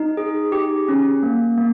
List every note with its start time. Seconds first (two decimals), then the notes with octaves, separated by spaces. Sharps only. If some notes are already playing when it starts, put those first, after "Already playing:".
Already playing: D#4
0.17 G#4
0.52 G4
0.88 C#4
1.23 A#3
1.58 A#3